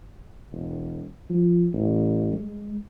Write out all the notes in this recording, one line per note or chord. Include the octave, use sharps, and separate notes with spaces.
E1
F3
A1
G#3